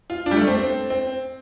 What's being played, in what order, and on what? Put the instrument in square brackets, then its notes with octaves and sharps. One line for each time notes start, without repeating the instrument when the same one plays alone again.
[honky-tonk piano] F4
D4
G3
A3
C4
C4
C4